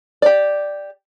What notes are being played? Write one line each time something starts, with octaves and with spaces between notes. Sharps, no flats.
G4 D5